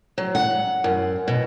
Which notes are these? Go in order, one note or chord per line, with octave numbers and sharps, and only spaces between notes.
F#3
F#5
F#2
B2